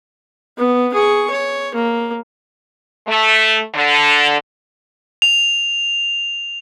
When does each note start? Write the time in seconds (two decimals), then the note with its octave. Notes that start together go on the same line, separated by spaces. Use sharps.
0.58 B3
0.94 G#4 C#6
1.30 C#5
1.74 A#3
3.08 A3
3.74 D3
5.22 F7